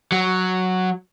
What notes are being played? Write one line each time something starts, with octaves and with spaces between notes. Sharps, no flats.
F#3